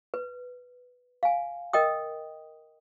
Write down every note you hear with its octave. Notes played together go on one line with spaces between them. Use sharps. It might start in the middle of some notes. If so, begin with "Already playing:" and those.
B4
F5 G#5
A#4 D#5 G5 D#6